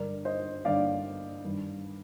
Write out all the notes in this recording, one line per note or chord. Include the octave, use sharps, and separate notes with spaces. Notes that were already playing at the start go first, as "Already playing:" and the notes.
Already playing: G2 D3 A#4 D5
C5 D#5
G2 D3 D5 F5
G2 D#3